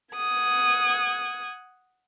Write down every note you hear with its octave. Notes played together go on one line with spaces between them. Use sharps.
F#5 D#6 G#6